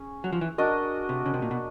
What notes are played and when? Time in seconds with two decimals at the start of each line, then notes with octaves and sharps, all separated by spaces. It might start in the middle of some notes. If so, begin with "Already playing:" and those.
Already playing: C#4 G#4
0.24 F#3
0.33 F3
0.41 E3
0.58 D4 F#4 A#4 D#5
1.09 C3
1.26 C#3
1.34 C3
1.42 A#2
1.51 B2